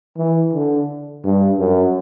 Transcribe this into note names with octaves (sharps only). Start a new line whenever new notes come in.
E3
D3
G2
F#2